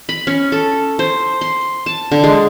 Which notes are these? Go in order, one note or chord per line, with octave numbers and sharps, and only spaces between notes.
B5
C#4
A4
C5
C6
A5
D3
G#3